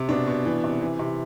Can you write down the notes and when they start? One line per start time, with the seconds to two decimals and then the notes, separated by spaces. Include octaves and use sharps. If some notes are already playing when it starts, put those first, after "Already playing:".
Already playing: C3
0.09 B2 D4
0.27 B2
0.46 E3
0.64 C3
0.82 E3
0.99 C3